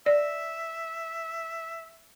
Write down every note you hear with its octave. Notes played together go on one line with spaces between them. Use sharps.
D5 E5